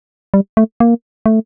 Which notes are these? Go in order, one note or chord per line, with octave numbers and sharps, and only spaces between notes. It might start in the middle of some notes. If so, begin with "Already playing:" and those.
G3
A3
A#3
A3